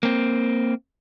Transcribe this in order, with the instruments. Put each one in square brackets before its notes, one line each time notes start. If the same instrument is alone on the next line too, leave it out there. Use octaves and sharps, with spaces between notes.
[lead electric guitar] A#3 C4